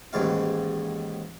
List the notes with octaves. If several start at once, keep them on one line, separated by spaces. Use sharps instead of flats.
A1 D#2 G#2 F5